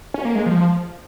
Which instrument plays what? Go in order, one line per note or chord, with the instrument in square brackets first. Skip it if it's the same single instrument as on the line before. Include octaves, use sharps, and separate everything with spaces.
[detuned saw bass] C#4
A#3
G#3
F3